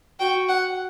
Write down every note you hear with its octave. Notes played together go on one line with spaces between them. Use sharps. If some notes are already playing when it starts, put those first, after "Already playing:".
F#4 G5
F#5